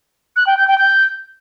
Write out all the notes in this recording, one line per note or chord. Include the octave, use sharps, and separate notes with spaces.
F#6
G5
G6
G5
G6